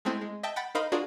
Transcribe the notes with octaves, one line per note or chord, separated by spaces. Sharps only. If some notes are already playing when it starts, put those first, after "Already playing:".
G#3 A3 C4 E4
G#3
D#5 E5 G5 A5
F#5 G5 B5 A6
D#4 A#4 C5 D#5 F5 B5
D4 F4 F#4 G#4 A#4 D5